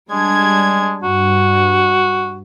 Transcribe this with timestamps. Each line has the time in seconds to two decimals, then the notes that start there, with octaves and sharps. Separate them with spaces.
0.11 G3 G#3 D4 G#6
1.03 G2 F#4